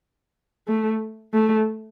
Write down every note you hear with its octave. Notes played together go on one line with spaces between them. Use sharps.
A3
A3